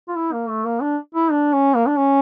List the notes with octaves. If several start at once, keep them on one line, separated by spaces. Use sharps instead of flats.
F4
E4
A#3
A3
A#3
D4
E4
D4
C#4
A#3
D4
C#4